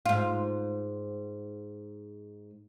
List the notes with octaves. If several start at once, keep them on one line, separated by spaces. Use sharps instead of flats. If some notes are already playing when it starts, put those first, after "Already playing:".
G#2 F4